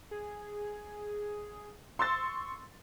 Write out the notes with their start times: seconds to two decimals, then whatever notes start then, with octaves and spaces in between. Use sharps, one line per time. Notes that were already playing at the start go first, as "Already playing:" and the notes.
0.11 G#4
1.99 C6 C#6 E6 A6